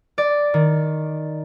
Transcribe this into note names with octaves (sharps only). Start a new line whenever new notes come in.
D5
D#3